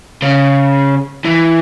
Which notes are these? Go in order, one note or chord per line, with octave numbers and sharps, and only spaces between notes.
C#3
E3